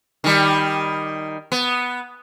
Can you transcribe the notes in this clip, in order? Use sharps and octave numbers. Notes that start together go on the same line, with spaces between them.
D#3 G3
B3